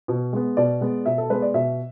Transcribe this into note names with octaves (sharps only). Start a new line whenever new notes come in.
B2
G#3 B3
B2 D5
G#3 B3
B2 E5
A4
G#3 B3 B4
D5
B2 E5